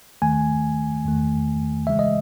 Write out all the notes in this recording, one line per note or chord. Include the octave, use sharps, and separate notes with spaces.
D#2 D#3 A3 G#5
E2 D#3 A3
C#2 C#3 E3 G#3 E5
D#5